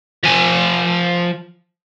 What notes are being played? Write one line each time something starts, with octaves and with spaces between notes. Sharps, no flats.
F3 G#5